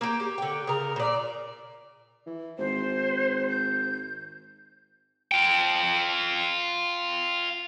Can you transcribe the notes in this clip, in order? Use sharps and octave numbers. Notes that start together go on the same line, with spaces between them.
A#3 G4
G4
D3 G5
C#3 A#4
A#2 D5
E3
G#1 C5
G6
F4 G5